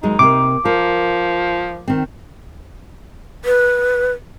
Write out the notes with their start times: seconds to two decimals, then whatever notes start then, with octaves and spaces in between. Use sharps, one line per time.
0.03 D#2 F#3 G#3 D#4
0.19 C3 A#3 D6
0.65 F3 A#4
1.88 D#3 C4
3.45 B4